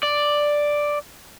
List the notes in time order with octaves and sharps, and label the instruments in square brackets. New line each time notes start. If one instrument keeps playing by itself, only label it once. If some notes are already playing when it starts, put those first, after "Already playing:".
[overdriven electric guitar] D5